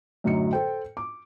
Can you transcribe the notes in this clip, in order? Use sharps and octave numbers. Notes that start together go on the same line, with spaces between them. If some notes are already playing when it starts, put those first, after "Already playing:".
F#2 A2 D3 F#3 D#4 C#7
A4 C5 G5
D6